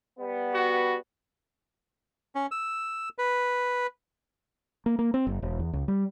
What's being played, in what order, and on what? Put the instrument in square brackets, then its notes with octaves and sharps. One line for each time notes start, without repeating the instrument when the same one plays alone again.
[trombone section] G3 B3
[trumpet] F#4
[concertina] C#4
E6
B4
[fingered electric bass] A#3
A#3
C4
F#1
E1
E2
C#2
G3